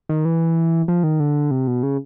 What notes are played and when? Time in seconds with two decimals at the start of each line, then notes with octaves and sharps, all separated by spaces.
0.09 D#3
0.25 E3
0.88 F3
1.03 D#3
1.20 D3
1.51 C3
1.67 B2
1.83 C#3